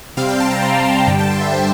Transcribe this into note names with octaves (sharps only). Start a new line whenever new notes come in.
C3 G3 C4 F5
G5
A5
A#5
C3 G3 C4 C6
A#5
A5
F5
G2 D3 G3 G5
A5
C6
E5
D3 G3 C5